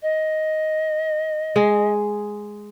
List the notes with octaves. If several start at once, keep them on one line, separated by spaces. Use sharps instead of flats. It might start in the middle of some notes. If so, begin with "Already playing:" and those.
D#5
G#3 G#4